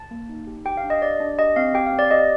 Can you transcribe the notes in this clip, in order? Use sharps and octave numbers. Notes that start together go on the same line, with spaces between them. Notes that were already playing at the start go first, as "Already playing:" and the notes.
Already playing: A5
A#3
D#4
G4
G4 G5
F5
D4
D#5
G4 D5
D4
G4 D#5
C4 F5
G4 G5
F5
C4
D5
G4 D#5